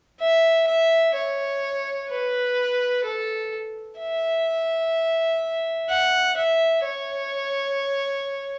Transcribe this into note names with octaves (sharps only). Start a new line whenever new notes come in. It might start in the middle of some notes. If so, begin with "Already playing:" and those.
E5
E5
C#5
B4
A4
E5
F#5
E5
C#5